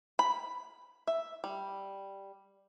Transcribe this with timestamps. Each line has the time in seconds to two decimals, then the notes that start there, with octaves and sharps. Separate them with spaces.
0.19 B5
1.07 E5
1.44 G3